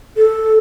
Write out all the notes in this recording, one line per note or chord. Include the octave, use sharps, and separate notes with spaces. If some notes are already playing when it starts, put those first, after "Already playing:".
A4